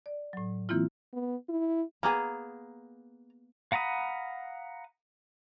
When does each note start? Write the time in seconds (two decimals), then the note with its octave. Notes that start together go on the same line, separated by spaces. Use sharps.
0.06 D5
0.33 A2 F#3
0.69 E3 A#3 C4 E4 F4
1.13 B3
1.49 E4
2.03 A#3 B3 G#4 A#5
3.72 F5 F#5 A#5 B5 D#6